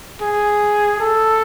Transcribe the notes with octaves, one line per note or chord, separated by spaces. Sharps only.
G#4
A4